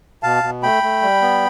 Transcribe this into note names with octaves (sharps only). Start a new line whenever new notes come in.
B2 F5 A5
B2
A3 G5 B5
A3
G3
B3